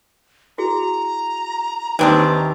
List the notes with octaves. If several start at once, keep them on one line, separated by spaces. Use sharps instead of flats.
E4 F#4 G#4 A#5
D#2 E3 C4 D4 D#4 C6 D#6